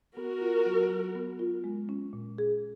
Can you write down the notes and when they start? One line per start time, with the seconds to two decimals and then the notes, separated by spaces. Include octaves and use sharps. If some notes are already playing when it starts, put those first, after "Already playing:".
0.16 B3 F#4 A#4
0.41 F4
0.66 F#3
0.91 F#3
1.15 B3
1.39 F4
1.64 G#3
1.89 C#4
2.13 A#2
2.38 G#4